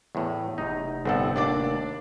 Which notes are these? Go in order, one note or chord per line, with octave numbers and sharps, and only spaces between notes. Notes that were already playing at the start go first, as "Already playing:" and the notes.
E2 A2
F1 D#4
G1 A2 C4 A4 F#5
D#2 D4 D5 D6